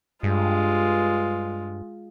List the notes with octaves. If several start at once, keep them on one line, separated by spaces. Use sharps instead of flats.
G2 G#3 F4